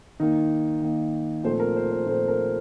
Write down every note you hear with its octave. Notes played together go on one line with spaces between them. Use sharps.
D#3 A#3 D#4
D#3 A#3
A#2 F3 A3 C4 C5
A#4
C5
C5
A#2 F3 A3 C4 C5
A#4